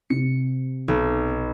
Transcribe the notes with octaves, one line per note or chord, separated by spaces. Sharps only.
C3 C#7
B1